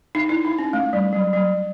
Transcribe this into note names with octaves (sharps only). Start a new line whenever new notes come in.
D#4
E4
D#4
C#4
A3
G3
F#3
F#3